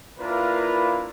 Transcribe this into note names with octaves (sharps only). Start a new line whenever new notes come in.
A#3 D4 E4 F4 A#4 B4